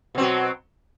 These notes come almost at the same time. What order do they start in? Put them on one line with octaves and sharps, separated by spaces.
B2 C4 F#3